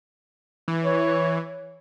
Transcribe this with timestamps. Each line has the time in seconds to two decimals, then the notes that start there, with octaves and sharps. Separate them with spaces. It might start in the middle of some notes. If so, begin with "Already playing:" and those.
0.68 E3
0.84 C#5